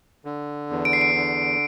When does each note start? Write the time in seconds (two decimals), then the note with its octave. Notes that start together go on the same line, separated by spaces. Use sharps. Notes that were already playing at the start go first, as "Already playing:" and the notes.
0.25 D3
0.70 E2
0.85 D7
0.93 C7
1.01 D7
1.15 D3